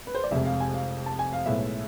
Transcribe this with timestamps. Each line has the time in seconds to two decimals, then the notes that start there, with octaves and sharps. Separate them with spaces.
0.07 B4
0.15 C5
0.24 D5
0.31 F1 F2 C3 G#3 E5
0.45 F5
0.60 G#5
0.74 F5
1.06 A5
1.19 G#5
1.33 F5
1.46 B1 A2 G#3 B3 E5